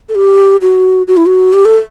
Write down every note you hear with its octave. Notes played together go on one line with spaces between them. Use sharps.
A4
G4
F#4
F#4
E4
F#4
G4
A4